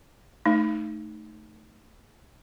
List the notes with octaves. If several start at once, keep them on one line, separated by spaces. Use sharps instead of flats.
A3 D#4